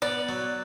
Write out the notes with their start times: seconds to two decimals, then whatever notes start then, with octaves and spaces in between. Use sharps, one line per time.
0.02 B3 D5
0.29 F#3